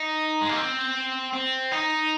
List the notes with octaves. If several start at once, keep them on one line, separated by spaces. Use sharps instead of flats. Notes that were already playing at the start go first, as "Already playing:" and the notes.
Already playing: D#4
G#3
A#3
C4
C4
D#4